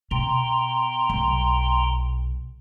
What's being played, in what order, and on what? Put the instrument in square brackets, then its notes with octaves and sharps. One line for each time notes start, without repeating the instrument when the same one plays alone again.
[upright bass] B2 [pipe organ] G5 A#5 C6
[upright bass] B1